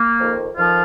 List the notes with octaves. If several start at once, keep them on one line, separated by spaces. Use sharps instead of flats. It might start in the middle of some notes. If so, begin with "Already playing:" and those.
Already playing: A#3
F2 D#3
F2 D#3 F3 F4